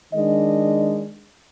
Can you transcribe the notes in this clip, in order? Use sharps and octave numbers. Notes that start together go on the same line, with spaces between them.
D#3 G#3 D4 D#5